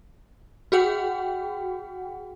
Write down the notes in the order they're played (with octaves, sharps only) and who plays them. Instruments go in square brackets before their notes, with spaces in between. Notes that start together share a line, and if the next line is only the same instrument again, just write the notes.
[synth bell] F#4 G#4 F#5 G5